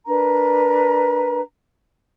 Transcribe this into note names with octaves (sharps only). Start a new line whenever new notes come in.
D4 A#4 B4 A#5